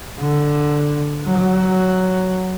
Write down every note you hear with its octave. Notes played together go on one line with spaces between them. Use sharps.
D3
F#3